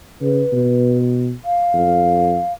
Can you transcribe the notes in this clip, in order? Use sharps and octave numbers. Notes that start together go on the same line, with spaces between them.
C#3 B4
B2
F5
F2